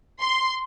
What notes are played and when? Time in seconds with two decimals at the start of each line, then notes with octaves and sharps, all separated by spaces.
0.20 C6